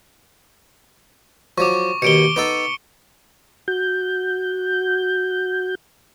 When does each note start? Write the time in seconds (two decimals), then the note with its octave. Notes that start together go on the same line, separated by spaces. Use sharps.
1.58 F3 F#3 C#6 D6
2.02 D#2 B2 C#7 D7 G7
2.36 B3 D#4 A4
3.68 F#4 G6